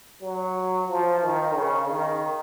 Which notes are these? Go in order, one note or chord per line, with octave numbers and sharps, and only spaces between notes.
F#3
F3
D#3
C#3
D#3